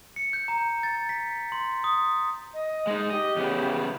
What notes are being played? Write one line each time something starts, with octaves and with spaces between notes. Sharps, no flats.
C#7
G6
A#5
A6
B6
C6
D#6
D#5
G#3 D#4
G4 D#5
E2 C#3 B3